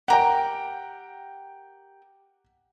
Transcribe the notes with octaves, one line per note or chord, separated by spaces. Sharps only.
G4 A#4 F#5 G5